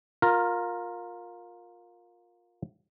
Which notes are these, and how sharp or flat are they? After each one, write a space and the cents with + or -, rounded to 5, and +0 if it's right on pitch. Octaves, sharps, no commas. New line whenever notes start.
F4 +20 A#4 +0